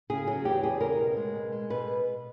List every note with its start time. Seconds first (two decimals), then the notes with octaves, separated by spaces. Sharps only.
0.10 C#3 G#4
0.27 F#3 G#4
0.45 E2 G4
0.63 E2 G#4
0.80 C#3 A#4
0.99 B2
1.17 G#3
1.35 B2
1.52 G#3
1.70 B2 B4